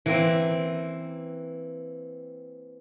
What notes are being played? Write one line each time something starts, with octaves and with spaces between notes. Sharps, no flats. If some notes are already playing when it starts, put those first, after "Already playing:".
E3 A#3 C4